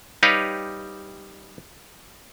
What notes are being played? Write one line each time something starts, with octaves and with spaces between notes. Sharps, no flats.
G3 D#4 G4 B4 C#5 F5